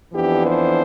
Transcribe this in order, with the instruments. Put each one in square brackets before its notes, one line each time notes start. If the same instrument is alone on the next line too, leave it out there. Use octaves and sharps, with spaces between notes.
[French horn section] F2 E3 B3 D4 G4
C5